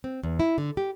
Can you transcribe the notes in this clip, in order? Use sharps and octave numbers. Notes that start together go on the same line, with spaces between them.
C4
E2
E4
D3
G4